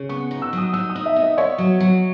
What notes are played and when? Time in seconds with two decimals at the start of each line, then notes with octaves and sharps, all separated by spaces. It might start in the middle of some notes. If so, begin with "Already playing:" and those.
Already playing: C#3
0.09 B3 C#6
0.31 D#4
0.42 E6
0.53 F#3 D#6
0.73 D#4 E6
0.89 D#6
0.96 D#4
1.06 E5
1.16 B3
1.22 D#5
1.38 B3 C#5
1.58 F#3
1.80 F#3